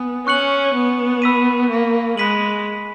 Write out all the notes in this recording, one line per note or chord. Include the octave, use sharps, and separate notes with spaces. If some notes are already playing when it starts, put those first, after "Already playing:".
Already playing: B3 G#5 D#6
C#4 C#6 F#6 C#7 F#7
B3
B5 E6 B6 D#7
A#3
G#3 B5 F#6 B6 D#7 F#7